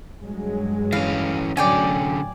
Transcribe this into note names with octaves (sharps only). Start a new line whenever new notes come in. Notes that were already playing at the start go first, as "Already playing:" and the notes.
G2 F#3 G#3
E3 C#4 F5
A2 D3 F#3 C#4 D5 G5 G#5